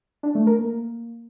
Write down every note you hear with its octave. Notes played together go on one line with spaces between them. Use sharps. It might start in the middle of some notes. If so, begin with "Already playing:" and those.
D4
A3
A#4
A#3